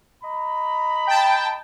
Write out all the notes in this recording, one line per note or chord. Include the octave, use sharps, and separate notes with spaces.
D#5 A#5 B5
G5 A5